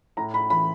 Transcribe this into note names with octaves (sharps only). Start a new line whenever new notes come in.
A2 A#5
B5
E3 B5